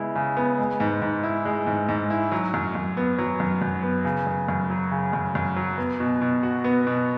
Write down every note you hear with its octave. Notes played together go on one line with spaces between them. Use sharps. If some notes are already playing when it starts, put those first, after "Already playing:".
Already playing: C#3 G#3 B3 E4
C#3
B3
G#3
G#2
G#2
E4
G#3
G#2
G#2
E4
F#3
F#2
F#2
B3
F#3
F#2
F#2
B3
C#3
F#2
F#2
F#3
C#3
F#2
F#2
F#3
B3
B2
B2
F#4
B3
B2